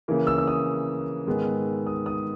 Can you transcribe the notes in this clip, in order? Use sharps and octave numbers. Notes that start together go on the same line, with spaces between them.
C#3 E3 A#3
E6
E6
D#6
G#2 D#3 G#3 B3
D#6
D#6